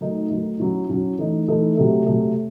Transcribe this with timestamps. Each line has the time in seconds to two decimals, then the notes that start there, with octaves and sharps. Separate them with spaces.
0.01 D#3 F#3 A3 D#4
0.30 D#3 F#3 A3 D#4
0.60 F#3 C#4 E4
0.89 F#3 C#4 E4
1.19 E3 A3 D#4
1.48 E3 A3 D#4
1.77 C3 F#3 A3
2.07 C3 F#3 A3